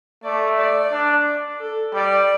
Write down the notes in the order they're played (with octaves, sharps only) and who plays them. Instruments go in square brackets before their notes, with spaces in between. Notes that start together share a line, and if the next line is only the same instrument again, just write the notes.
[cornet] A3 [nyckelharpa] D5
[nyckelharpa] D5
[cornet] D4
[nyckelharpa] A4
[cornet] G3 [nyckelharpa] D5